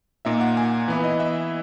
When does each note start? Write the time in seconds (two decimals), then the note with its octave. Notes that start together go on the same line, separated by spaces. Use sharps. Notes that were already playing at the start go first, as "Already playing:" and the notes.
0.25 A#2 A#3 D#4 E5
0.41 F#5
0.57 G#5
0.88 E3 B3 E4
1.04 D#5
1.20 E5